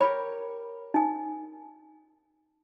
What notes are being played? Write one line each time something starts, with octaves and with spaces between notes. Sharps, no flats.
G4 A#4 C#5 B5
D#4 G#5